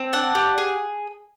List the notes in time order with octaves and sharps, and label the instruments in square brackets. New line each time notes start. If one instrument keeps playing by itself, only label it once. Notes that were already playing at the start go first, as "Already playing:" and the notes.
Already playing: [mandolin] C4
D4 F#5
G4
G#4